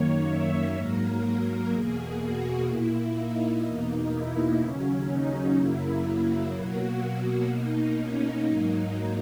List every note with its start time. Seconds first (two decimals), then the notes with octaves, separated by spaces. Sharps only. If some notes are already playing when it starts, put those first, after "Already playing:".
Already playing: F#2 D#3 A#3 C#5
0.27 E5
0.75 G#2 F#3 A#3 A#4
1.72 E2 B2 A#3 G#4
2.20 F#4
2.68 A#2 A#3 E4
3.16 D#4
3.64 E2 B2 A#3 D#4
4.13 E4
4.61 D#2 C#3 F#3 C#4
5.08 D#4
5.57 F#2 C#3 F#3 A#3 E4
6.53 B2 F#3 A#3 F#4
7.00 F#4
7.49 B2 A#3 D#4
7.98 C#4
8.45 G#2 F#3 A#3 D#4